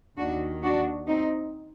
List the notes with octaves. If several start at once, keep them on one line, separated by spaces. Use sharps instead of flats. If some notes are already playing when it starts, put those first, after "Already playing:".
D#2 D#3 D4 F#4
D4 F#4
C4 D#4